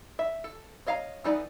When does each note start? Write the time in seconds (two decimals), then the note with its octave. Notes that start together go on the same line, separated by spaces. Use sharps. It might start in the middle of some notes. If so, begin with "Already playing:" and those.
0.19 E5
0.44 A4
0.86 C#5 D#5 F5 F#5 A#5
1.24 E3 B3 D#4 A4 D5